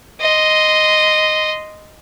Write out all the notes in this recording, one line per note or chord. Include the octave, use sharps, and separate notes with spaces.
D#5 C6